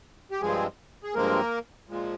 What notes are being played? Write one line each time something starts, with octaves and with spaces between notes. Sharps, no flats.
G4
G2 F3 G#3 C4 G#4
G#4
G2 F3 G#3 A#3 C4 A#4
A#2 F3 G#3